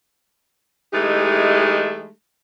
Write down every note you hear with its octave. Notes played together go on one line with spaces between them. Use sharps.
E3 G#3 A3 D#4 G4